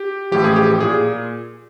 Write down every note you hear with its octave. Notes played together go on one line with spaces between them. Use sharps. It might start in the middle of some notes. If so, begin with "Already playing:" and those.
Already playing: G4
A1 A2 F3 G4
G#4
G4
A#2 G#4